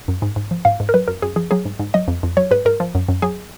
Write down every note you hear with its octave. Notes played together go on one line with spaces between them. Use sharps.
F#2
G#2
G#2
F3
G#2 F5
G#2
A#4
F#3 B4
F#2 A#4
F#2 G#4
F3 G#4
F#3 G#4
G#2
G#2
F#3 D#5
F2
F2
F#3 C#5
G#2 B4
G#2 A#4
F3
F#2
F#2
F#3 G#4